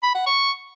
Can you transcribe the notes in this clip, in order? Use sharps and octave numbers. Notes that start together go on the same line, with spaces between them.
B5
F#5
C#6